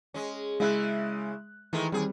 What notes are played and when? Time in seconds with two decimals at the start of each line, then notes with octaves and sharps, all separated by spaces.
0.14 G#3 C#4
0.60 C#3 G#3 E4 E5 F#6
1.73 D#3 E3 G#3 A3
1.92 D#2 G3 C4 G#4